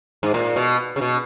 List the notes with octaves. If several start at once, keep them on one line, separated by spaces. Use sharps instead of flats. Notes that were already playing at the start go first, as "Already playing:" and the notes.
G#2
A#2
B2
C#3
B2